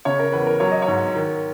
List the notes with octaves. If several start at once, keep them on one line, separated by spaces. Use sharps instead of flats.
C#3 C#5
A#4
E2 B4
A#4
F#3 C#5
D#5
C#5
G#2
D#3